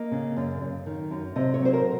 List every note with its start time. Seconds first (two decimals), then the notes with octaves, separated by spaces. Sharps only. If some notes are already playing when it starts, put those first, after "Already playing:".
Already playing: A#3 D#5
0.12 C#3
0.37 F#2
0.61 F#2
0.86 D#3
1.11 F#2
1.36 C3 D#5
1.54 C#5
1.60 F#3
1.65 C5
1.73 A#4